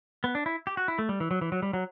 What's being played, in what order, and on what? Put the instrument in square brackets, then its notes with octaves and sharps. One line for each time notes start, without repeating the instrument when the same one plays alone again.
[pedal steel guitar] B3
D4
E4
G4
F#4
E4
A3
G3
E3
F#3
E3
F#3
G3
F#3